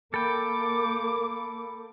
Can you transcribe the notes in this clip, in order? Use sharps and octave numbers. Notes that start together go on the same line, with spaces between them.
A#3 A4 G5 B5 D6